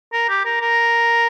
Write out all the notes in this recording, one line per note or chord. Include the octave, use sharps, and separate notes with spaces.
A#4
G4
A#4
A#4